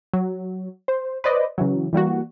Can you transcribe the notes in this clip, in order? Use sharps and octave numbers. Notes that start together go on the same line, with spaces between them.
F#3
C5
B4 C5 D5 D#5
C#3 E3 F#3
E3 G3 A#3 F#4